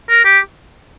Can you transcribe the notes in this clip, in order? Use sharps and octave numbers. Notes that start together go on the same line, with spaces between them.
A#4
G4